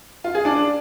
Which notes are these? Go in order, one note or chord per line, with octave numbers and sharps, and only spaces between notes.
F4
G#4
D4